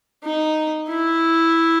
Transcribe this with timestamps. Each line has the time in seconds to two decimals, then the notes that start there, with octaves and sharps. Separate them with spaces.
0.24 D#4
0.89 E4